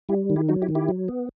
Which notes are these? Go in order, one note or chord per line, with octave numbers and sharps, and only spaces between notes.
G3 E4 G4
D#3
E4 G4
F#3 D#4 F#4
E4 G4
D#3
E4 G4
F#3
B3